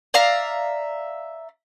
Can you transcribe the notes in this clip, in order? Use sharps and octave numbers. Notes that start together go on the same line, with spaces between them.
D5 E5 F5 A#5